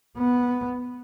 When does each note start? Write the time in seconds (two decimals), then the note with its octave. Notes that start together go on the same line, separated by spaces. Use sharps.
0.18 B3